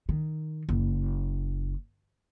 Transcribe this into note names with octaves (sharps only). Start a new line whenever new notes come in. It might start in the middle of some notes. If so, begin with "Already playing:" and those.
D#3
F#1